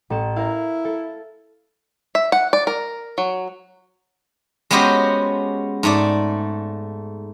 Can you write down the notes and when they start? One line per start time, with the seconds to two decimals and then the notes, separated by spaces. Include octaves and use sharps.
0.10 A1 A4 E7
0.36 E4 A#4 F5
0.85 A4
2.15 E5
2.32 F#5
2.53 D5
2.67 A#4
3.18 F#3
4.71 G#3 B3 C#4 F#4 G4 C5
5.83 G#2 A3 D5